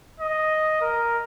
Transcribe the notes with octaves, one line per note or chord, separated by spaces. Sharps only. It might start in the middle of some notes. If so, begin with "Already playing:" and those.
D#5
A#4